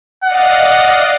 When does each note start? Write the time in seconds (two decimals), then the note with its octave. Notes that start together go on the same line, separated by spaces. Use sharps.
0.24 D5 D#5 F5 F#5